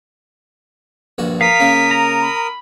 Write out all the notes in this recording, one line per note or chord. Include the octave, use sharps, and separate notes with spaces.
A#1 G2 F#4
A#4 F5 D#6 B6
C#3 A#3
A#5
B5